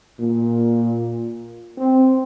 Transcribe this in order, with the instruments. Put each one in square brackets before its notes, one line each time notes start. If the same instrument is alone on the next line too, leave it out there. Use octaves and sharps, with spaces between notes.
[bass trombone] A#2
C4